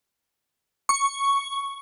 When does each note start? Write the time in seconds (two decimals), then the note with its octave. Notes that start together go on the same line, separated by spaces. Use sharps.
0.89 C#6